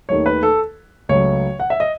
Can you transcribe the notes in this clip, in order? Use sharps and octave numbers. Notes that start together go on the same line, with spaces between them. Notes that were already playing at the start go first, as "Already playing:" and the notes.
D#2 D#3 A3 C#5
B4
A4
C#2 C#3 F#3 A3 C#5
F#5
E5
D#5